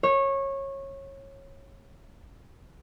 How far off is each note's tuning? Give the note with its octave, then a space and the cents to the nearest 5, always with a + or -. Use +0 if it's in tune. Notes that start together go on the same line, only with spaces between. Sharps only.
C#5 -20